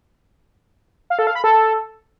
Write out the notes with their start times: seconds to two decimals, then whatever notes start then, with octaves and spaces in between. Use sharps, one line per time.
1.10 F5
1.19 A4
1.27 F5
1.35 B5
1.44 A4